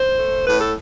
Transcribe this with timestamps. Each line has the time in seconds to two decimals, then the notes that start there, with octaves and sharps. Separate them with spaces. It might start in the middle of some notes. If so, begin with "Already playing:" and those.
Already playing: C5
0.18 A3
0.46 A2 B4
0.60 A4